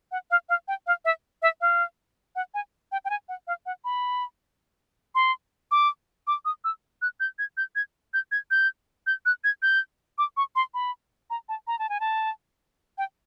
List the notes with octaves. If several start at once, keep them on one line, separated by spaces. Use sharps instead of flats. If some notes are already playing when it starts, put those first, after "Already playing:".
F#5
F5
F5
G5
F5
E5
E5
F5
F#5
G#5
G5
G5
G#5
F#5
F5
F#5
B5
C6
D6
D6
D#6
E6
F#6
G6
G#6
G6
G#6
G6
G#6
G6
G6
F#6
G#6
G6
D6
C#6
C6
B5
A#5
A5
A#5
A5
G#5
A5
G5